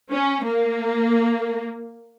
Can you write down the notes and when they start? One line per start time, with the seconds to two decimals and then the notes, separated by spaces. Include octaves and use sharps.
0.11 C#4
0.44 A#3